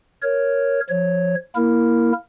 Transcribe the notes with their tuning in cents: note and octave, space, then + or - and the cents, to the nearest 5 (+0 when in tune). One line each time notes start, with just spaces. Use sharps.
A#4 +0 C#5 +0
F3 +0 C#5 +0
A#3 +15 E4 +0 A#4 -5